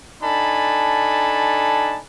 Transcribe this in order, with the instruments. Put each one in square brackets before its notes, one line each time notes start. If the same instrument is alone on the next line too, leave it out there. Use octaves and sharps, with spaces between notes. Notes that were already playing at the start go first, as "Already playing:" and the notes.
[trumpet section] D4 D#4 A4 G#5 A5 B5